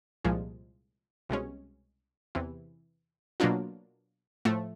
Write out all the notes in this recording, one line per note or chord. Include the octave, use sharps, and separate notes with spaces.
C2 A#2 F3 G#3
C2 B2 G#3 C#4
E2 C3 E3
B2 F#3 A#3 D4 F4
A2 F3 A3